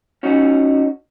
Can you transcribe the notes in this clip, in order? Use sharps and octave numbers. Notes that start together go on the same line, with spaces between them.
C#4 D#4 F#4